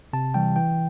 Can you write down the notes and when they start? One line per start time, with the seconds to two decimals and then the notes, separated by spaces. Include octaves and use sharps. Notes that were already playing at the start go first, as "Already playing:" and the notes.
0.13 C3 A5
0.34 E3 G3 G5
0.56 E3 G5